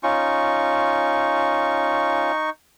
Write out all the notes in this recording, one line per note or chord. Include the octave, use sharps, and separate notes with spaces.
C#4 D#4 F4 C#6